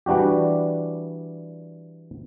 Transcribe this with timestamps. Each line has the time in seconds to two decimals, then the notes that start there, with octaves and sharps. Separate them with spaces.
0.06 E3 G3 D4 F#4 G4